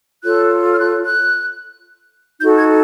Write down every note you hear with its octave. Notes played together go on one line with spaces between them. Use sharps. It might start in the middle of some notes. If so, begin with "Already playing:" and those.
F4 A4 C#5 F#6
F6
F#6
F#6
D#4 F#4 A4 G6
G#6